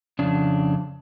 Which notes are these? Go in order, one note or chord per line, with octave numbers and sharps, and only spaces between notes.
F2 C#3 D4